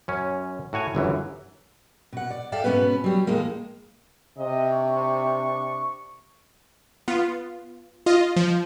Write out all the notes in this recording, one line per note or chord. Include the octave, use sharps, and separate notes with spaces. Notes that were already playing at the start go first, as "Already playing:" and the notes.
F#2 C#4
A2 F#4 C#5 G#5
G1 F#2 E3
B2 F#5
D5
A4 D5 E5 F5 G5
G#2 B2 D#3 B3 C#4 B4
F#3 G3
E2 A2 G#3 A#3
C3 D#5
D4 C#6
B3 F4
F4 D#5
F3